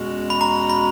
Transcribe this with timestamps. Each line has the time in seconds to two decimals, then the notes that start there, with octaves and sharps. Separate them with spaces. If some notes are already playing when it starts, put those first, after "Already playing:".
Already playing: E2 B2 G#3 C#4 F#4
0.30 B5
0.41 A#5
0.70 B5